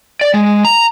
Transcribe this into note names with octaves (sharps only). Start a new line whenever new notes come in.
D5
G#3
A#5